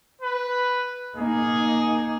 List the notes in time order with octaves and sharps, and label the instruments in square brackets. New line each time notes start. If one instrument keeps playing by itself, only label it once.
[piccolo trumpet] B4
[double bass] A#3 D#4 [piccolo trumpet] G#4